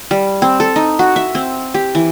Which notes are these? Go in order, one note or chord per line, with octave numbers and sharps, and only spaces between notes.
G3
C4
A4
D#4
F#4
E5
C4
G4
E3